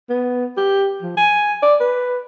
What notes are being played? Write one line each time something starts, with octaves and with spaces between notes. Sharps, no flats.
B3
G4
F3
G#5
D5
B4